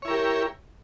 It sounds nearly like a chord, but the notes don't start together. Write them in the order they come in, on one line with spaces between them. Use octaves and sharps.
C#5 E4 A#4 G4